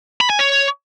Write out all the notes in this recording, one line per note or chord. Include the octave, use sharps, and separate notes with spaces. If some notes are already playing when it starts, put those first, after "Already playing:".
B5
G#5
C#5